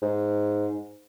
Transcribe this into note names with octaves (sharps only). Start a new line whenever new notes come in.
G#2